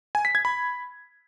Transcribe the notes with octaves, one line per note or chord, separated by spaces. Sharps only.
G#5
B6
G#6
B5